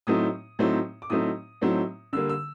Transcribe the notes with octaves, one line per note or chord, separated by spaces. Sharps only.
A2 F#3 A3 C4 D#4 D#6
A2 F#3 A3 C4 D#4
D6
A2 F#3 A3 C4 D#4 D#6
A2 F#3 A3 C4 D#4
D3 G3 A#3 E6
E6